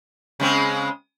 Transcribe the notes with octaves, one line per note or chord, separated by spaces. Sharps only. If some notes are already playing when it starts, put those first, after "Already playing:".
C#3 G#3 C4